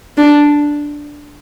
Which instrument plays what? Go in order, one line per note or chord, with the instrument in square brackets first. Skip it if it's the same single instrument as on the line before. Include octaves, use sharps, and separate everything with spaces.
[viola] D4